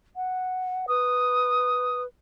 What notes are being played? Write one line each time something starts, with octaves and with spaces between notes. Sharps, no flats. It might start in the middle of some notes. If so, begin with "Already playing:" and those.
F#5
B4 D#6